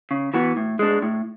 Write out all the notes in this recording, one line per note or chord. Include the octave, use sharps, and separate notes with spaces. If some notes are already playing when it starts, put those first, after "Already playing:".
C#3
E3 B3 F#4
A2
G#3 D4
A2